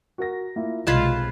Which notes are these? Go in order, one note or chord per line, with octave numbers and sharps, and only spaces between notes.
F#4 A#4 A#6
A#3 E4 F4
B1 C3 G#3 F4 B4 D#5 A5 G#6